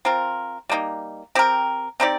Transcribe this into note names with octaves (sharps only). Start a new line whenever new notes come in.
C4 F4 A#4
G3 A#3 D#4
C4 G4 A#4
C4 D#4 G4 D5